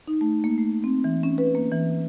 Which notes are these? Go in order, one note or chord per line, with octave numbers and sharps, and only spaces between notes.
D#4
A3
A#3
A3
C4
E3
C#4
B4
A#3
E3